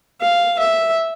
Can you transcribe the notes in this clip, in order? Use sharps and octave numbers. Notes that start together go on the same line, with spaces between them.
F5
E5